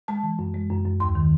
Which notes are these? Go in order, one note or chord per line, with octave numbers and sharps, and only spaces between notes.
G#3 A5
E3
F#2
G#3
F#2
F#2
D#2 C6
D#3